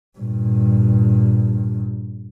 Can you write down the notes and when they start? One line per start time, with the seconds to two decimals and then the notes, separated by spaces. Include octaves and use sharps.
0.19 G2 A#2